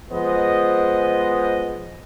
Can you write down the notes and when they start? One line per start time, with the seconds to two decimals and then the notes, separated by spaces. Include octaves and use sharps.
0.11 F3 G#3 B3 C5 D#5